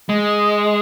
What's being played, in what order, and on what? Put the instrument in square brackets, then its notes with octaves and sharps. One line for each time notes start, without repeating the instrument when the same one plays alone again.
[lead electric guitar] G#3